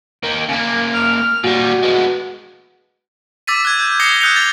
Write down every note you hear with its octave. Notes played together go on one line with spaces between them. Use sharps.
D#3 A#3
C#3 A#3
F6
A#2 G3 F#4
G#3 B3
D6 E6 A6 B6 D#7
F#6 G#6
G6
D#6 G#6 A#6 C7 C#7 G7
D#6 F#6 G6 A#6 C#7 F7
A6 G7